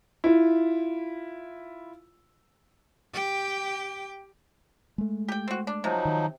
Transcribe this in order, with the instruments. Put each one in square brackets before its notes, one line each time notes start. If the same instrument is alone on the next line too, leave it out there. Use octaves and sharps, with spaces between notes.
[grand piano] E4 F4
[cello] G4 G5
[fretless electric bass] G#3 A3
[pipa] G4 G5
C4 F#4
D4
[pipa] C3 [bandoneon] F3 F#3 D#4
[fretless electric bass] D#3